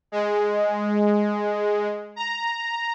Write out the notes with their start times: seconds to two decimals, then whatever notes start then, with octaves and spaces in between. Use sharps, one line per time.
0.12 G#3
2.16 A#5